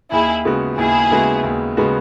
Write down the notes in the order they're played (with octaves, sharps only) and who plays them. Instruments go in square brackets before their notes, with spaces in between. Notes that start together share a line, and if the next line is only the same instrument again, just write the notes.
[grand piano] D#2 [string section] E4 G#4
[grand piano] C#3 G#3 B3 F#4
[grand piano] D#2 [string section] E4 G#4
[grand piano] C#3 G#3 B3 F#4
D#2
C#3 G#3 B3 F#4